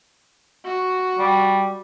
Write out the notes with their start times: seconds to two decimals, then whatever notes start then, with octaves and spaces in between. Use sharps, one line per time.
0.65 F#4
1.19 G3